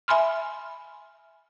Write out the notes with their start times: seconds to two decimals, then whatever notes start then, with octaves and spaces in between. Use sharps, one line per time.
0.08 E5 G#5 B5 C6 F6